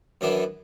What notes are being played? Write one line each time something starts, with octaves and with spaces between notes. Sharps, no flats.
F#2 E3 B3 D4